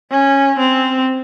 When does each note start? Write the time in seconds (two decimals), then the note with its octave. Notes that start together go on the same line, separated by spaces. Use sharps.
0.11 C#4
0.59 C4